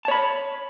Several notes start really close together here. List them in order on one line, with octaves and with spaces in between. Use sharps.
A5 C#5 B5